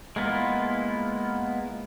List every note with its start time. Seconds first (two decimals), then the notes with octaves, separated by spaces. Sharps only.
0.16 G#3 A#3 B3 E4 F4